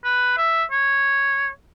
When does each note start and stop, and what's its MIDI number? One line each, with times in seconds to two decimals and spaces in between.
0.04 0.34 71
0.38 0.64 76
0.71 1.49 73